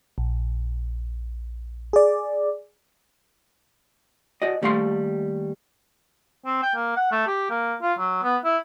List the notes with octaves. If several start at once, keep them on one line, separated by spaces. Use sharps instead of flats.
A#1
G#4 D5
F#4 D5 D#5
D#2 G3 A3 F5 C6
C4
G5
A#3
F#5
A3
G4
A#3
F4
F#3
B3
E4